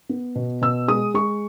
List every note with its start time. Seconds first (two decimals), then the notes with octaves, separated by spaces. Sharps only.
0.09 B3
0.35 B2
0.62 B2 E6
0.88 G#3 D#6
1.14 G#3 C#6